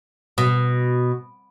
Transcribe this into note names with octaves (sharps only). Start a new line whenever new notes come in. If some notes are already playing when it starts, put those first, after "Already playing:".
B2